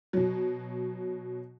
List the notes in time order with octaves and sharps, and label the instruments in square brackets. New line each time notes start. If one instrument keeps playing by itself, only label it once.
[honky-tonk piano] B2 F#3